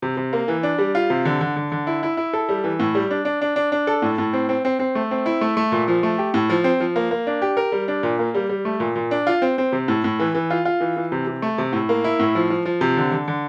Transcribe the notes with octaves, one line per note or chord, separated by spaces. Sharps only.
C3
C3
A#3
E3
D4
G3
F4
C3
D3
D3
D3
D3
E4
E4
E4
A4
G3
E3
A2
G3
D4
D4
D4
D4
D4
A4
A2
A2
C4
C4
C4
C4
A3
C4
E4
A3
A3
A#2
F3
A3
G4
A2
F3
C4
F3
A#3
A#3
D4
G4
A#4
G3
D4
A#2
A#3
G3
G3
A3
A#2
A#2
D4
F4
C4
C4
C3
A2
A2
E3
E3
F4
F4
E3
E3
C3
C3
A3
C3
A2
A#3
E4
A2
F3
F3
F3
C3
D3
D3
D3